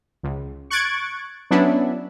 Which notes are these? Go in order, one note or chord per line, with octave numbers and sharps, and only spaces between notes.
C#2
C#6 F#6 G#6 A6 D7
F#3 B3 C#4 D4 E4